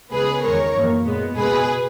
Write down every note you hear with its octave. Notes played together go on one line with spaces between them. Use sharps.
C#2 C#3 G#3 B3 G#4 B4
E2 D#3 G#3 A#4 C#5
F#2 E3 A#3
A#2 G#3 B3
C#2 B2 G#3 B3 G#4 B4